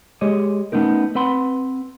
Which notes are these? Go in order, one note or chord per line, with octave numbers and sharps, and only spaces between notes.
G#3 G4 G#4 C#5 D#5
A3 B3 C#4 D#4 A#4
C4 B4 F#5 B5 C6